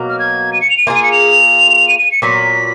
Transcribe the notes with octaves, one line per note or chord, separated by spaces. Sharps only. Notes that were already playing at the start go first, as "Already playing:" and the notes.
Already playing: B2 F#3 A#3
F6
G#6
D#7
C#7
F7
D#7
A#3 F4 G#4
D#7
C#7
F7
D#7
D#7
C#7
A#2 F#3 B3 B6